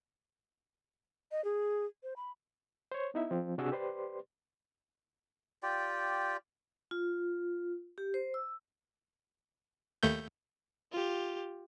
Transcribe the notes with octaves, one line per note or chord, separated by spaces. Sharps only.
D#5
G#4
C5
B5
C5 C#5
B3 D#4 E4 E5
F3 C4
C3 D4 F#4 G#4 E6
G4 B4 C5 D5 C6
F4 G4 D5 G5
F4
G4
C5
E6
D#2 A3 G6
F4 G4